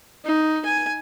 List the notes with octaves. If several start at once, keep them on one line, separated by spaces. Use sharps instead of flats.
D#4
G#5